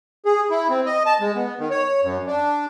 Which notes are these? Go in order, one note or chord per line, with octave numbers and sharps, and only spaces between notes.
G#4
E4
C4
D#5
A5
G#3
B3
D#3
C#5
F#2
D4